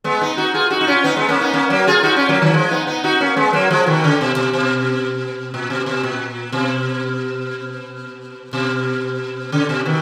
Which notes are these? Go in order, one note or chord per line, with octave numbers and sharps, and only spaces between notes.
G#3 B3
B3 D#4
D#4 F#4
F4 G#4
D#4 F#4
D#4
C#4 F4
B3 D#4
G#3 B3
A#3 C#4
B3 D#4
A#3 C#4
F#3 A#3
F4 G#4
D#4 F#4
C#4 F4
F#3 A#3
D#3 F#3
F3 G#3
B3 D#4
B3 D#4
D#4 F#4
A#3 C#4
G#3 B3
F#3 A#3
F3 G#3
B2 D#3
C#3
B2
B2
B2
A#2
B2
B2
A#2
B2
B2
C#3
B2
B2 D#3